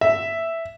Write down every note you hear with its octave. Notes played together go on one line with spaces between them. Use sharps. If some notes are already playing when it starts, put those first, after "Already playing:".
E5